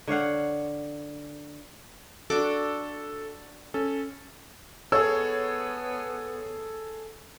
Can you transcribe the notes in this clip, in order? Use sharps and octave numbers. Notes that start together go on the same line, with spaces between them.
D3 C#5 F5 F#5
D4 F#4 A4 D6
C#4 A4
B3 G#4 A4 C#5 E6